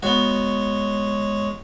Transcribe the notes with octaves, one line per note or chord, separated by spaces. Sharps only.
G#3 B3 F#4 C#5